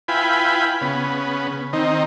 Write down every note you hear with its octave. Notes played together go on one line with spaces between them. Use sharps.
E4 F4 B4 G5 G#5 B5
C#3 B3
D#3 C4 D#4